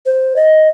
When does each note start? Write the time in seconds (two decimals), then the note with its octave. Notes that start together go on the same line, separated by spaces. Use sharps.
0.06 C5
0.36 D#5